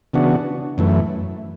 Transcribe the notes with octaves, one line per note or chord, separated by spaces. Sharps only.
C#3 E3 B3 D4 F#4
F#2 E3 A3